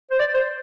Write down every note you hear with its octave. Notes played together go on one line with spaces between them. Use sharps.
C5
D5
C5